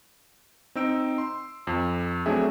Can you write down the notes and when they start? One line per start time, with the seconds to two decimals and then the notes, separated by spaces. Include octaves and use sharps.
0.75 C4 D#4 E6 D7
1.18 C6
1.67 F2
2.26 F#3 A3 C4 D4 G#4 E5